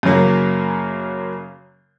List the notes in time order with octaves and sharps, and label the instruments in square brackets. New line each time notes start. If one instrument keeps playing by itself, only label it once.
[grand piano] F#2 C#3 F#3 A#3